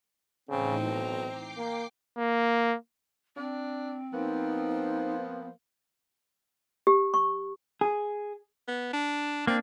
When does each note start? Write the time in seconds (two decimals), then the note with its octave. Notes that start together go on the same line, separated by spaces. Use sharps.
0.49 A2 C#3 E3 C4 D#4
0.82 B1 A#5
1.22 G5 D6 C7
1.57 A#3
2.18 A#3
3.36 C4 D4
4.13 F3 A#3 B3 D#4 C5
6.87 G4
7.14 C#6
7.81 G#4
8.68 B3
8.93 D4
9.47 A#3 C4 D4